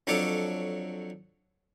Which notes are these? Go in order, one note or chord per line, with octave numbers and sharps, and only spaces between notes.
F2 F#3 D4 A4 C#5 D6